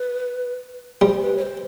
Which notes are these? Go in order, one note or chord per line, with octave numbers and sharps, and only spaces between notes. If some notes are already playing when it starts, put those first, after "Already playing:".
Already playing: B4
G3 C5
B4
C#5
C5